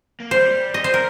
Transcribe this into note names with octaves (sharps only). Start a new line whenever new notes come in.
A#3
G3 C5
D#5
C5
A#4